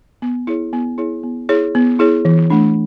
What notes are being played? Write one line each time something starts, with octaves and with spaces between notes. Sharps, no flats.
B3
E4 G#4 C#5
B3
E4 G#4 C#5
B3
E4 G#4 C#5
B3
E4 G#4 C#5
E3
A3 D4